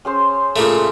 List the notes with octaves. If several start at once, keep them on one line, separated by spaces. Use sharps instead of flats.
C#4 G#4 C5
A#2 C#3 A3
G#4